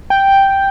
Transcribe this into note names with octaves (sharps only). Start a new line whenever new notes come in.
G5